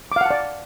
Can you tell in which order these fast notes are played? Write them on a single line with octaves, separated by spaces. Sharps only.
D6 F5 F#5 A5 D5